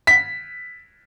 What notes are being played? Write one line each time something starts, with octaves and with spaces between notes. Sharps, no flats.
B6